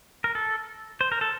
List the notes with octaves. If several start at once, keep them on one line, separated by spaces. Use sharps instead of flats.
A#4
A4
C5
A#4
A4